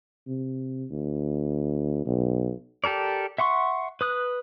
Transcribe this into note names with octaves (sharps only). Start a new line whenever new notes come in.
C3
D2
B1
G4 A4 A#4 D5
E5 F#5 C6 C#6
B4 D#6 F#6